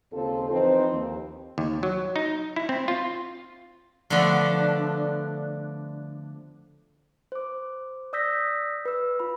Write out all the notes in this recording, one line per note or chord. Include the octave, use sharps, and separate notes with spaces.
D#2 C#3 C4 F4 A4
E3 F3 C4 D#4 B4 C5
D#2
D#2
F#3
D#4
E4
C4
F4
D3 F3 A3 B3 D4
C5 D6
D5 D#6 E6 G6 A#6 B6
B4 E6
F4 B5